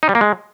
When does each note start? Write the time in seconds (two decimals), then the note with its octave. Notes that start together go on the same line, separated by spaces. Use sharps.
0.03 D#4
0.09 G3
0.15 A#3
0.21 G#3